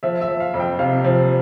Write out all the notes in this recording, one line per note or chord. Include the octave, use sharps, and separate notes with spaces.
F3 E5
E5
F3
F5
F2
G5
C3 F5
F3